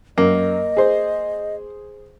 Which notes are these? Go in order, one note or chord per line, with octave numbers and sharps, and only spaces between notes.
F#2 A#3 D#5
G#4 C5